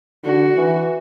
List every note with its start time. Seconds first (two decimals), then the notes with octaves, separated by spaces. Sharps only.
0.24 D3 F#4
0.56 E3